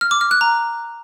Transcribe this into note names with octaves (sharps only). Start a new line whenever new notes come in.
F6
D6
F6
F#6
A#5